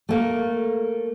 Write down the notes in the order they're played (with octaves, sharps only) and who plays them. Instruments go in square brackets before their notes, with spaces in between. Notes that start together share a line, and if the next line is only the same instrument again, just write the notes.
[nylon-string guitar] A3 A#3